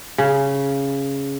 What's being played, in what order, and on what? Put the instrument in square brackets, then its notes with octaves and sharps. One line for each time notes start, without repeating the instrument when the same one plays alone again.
[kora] C#3